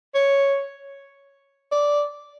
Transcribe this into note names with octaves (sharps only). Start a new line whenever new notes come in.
C#5
D5